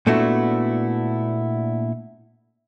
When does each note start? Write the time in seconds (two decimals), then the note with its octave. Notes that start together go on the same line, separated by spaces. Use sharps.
0.07 A#2 A3 B3 D4 E4 F#4